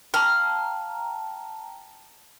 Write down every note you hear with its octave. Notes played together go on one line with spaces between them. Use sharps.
F5 G5 A5 A#5